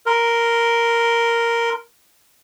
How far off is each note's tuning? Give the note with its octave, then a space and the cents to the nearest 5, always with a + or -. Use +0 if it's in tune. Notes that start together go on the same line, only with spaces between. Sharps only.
A#4 +0 C6 -20